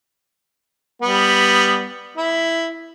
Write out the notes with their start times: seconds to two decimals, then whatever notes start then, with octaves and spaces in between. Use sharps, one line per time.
1.02 G3 B3
2.17 E4